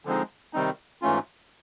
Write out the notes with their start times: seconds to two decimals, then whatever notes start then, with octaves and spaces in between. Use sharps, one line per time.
0.05 D3 F3 G#3 C4 D#4
0.53 C3 D#3 G3 C4 D#4
1.02 G#2 E3 A3 C#4 F4